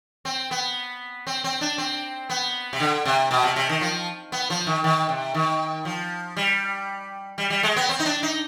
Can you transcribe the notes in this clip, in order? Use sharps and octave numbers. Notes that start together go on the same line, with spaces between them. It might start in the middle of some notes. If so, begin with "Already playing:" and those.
C4
B3
C4
C4
D4
C4
B3
C3
D3
C3
B2
C3
C3
D#3
F3
B3
F3
D#3
D#3
C3
D#3
F3
G3
G3
G3
G#3
B3
C4
D#4
D4
D#4